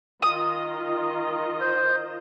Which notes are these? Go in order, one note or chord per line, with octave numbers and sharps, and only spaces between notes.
D#3 F4 D#5 D#6
C5